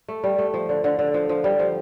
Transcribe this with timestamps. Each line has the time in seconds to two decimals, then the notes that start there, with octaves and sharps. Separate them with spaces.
0.08 A3
0.24 G3
0.38 A3
0.54 F3
0.69 D3
0.84 D3
0.99 D3
1.14 F3
1.29 F3
1.44 G3
1.59 F3